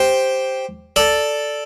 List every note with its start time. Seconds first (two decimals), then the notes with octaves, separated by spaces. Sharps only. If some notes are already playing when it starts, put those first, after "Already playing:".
Already playing: G4 C5
0.96 A4 D5